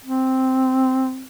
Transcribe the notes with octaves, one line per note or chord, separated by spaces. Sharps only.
C4